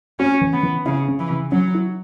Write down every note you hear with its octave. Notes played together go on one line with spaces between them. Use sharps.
C#4 F#4
E3
B3
E3
C#3 E4
C#3
E3
C#3
F#3 C#4
E4